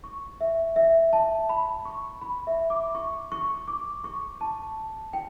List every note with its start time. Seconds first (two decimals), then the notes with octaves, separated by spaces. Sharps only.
0.04 C#6
0.41 E5
0.76 E5
1.13 A5
1.49 B5
1.85 C#6
2.22 B5
2.47 E5
2.70 D6
2.95 C#6
3.32 C#6
3.68 D6
4.04 C#6
4.41 A5
5.13 G5